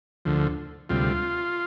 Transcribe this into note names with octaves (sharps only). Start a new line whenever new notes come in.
D2 D3 F3
D2 C3 G3 F4